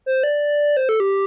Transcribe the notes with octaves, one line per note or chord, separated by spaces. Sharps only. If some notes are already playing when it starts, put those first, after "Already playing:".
C5
D5
C5
A4
G4